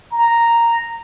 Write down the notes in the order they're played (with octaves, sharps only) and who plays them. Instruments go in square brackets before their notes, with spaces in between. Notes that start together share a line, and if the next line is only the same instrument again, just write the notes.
[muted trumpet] A#5